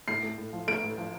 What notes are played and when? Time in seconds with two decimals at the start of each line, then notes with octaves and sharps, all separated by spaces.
0.08 A2 C7
0.23 A3
0.38 A2
0.53 F3
0.67 A3 D7
0.83 A2
0.98 F3